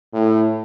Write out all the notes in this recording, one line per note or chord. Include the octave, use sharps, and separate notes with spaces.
A2